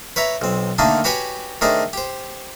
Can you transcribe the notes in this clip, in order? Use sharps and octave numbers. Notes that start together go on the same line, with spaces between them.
B4 C#5 E5 A#5
B1 C4
D3 D#3 A3 A#3 D4 D#4
F#4 G4 B4 C#5 G5 G#5
D#3 A3 D4 D#4 G#4 C5
G4 C5